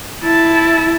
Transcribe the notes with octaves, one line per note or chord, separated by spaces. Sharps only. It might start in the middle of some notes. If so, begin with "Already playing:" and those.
E4 A5